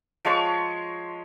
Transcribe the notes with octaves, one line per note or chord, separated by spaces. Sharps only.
F3 G#3 C#5 C#6